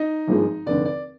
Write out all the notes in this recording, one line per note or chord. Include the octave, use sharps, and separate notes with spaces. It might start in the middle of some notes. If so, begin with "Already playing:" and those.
Already playing: D#4 D#5
G#1 G2 F3 G#3
F1 D#2 D3 D5
D5